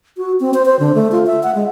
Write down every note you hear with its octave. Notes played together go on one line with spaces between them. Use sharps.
F#4
C4
C5
C5
D3
A3
F4
E5
F#5
G#3